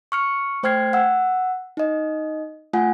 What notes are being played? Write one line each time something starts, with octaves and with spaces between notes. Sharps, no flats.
C#6 F6 C#7
A3 C5 G5 F6 G#6 C7
F#5 E6
D#4 D#5
A3 F4 F#5 G#5